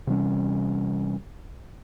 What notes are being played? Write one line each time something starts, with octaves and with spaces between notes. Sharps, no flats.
C3 E3 G3 C#4